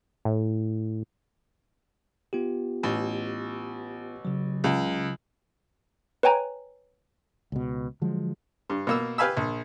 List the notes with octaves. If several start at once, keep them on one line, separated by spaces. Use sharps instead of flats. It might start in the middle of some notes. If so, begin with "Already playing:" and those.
A2
B3 F4 G4
A1
C#3 F#3
C#2
B4 C#5 G5 G#5 A#5
C#2 B2
D3 F3 F#3 G#3
G2
B2 A#3 E6
G4 B4 F5 G#5 B5 E6
A#1